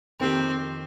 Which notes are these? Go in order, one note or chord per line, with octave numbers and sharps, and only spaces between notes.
F2 D#3 A#3 C4 G4